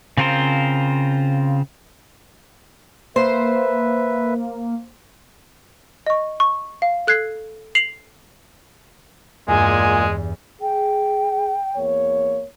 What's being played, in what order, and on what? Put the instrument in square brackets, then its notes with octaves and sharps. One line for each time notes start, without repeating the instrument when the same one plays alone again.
[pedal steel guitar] C#3 C4 F4 A#4 C5
[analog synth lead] A#3 [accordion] B4 E5 [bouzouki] C5
[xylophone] D#5 C#6
C#6
F5
A4 F#6 G#6 C7
C7 F7 F#7
[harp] E2 G2 [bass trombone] A#2 [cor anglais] G#3 [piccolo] G#5
[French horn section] G#4 [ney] G5
[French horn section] E2 A#3 C#5